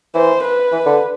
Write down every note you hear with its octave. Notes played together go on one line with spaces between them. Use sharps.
E3 C5
B4
E3
D3